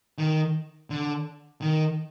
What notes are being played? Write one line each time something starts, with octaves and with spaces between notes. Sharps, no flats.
D#3
D3
D#3